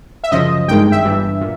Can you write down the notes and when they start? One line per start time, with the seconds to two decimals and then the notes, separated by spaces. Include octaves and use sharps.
0.24 E5
0.31 F#2 C#3 F3 D#5
0.68 G#1 G2 D#3 G#3 G5
0.92 E5
1.04 G1 G2 E3
1.41 A#2